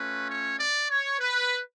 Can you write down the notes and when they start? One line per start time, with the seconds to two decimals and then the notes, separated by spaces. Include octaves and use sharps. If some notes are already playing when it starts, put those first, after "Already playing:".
Already playing: A3 C#4 F4 B4
0.30 C#5
0.60 D5
0.90 C#5
1.20 B4